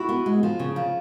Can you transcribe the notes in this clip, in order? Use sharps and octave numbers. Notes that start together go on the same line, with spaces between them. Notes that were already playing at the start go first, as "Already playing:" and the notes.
Already playing: E4 F#4
B3
G#3
F3
C#3
F3